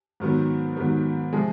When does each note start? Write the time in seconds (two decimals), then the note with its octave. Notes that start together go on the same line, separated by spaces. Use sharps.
0.20 G#2 D#3 F#3 B3
0.76 G#2 D#3 F#3 B3
1.33 C3 F3 G#3